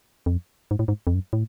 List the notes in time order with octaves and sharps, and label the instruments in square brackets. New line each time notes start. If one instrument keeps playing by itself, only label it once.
[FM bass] F2
G#2
A2
G#2
F2
F#2
A2